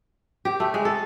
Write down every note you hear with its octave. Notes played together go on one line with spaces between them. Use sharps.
G4
A3
G#3
A4